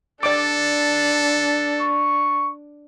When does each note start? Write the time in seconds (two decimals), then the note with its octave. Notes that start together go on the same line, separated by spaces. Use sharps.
0.23 D4 A4 D5 D6
1.81 C#6